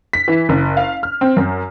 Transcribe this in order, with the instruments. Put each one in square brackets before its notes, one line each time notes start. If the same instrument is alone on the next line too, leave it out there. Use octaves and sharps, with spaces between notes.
[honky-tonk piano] B6
E3
F#1
F5
F6
C4
F#2